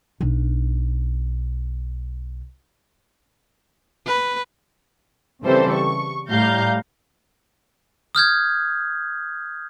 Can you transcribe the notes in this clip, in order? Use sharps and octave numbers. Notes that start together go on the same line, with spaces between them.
B1 D4
B4
C#3 E3 G3 C4 A4 C5
C#6
A2 G3 F5 A#5 G6
D#6 F6 G6 G#6